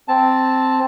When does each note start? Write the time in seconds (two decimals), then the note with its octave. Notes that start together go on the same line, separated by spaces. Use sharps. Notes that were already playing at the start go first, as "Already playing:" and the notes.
0.08 C4 A5